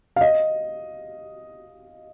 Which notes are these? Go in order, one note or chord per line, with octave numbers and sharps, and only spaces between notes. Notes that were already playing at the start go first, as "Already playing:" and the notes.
F5
D#5